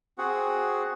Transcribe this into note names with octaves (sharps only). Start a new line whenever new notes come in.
C4 F#4 G#4 F#5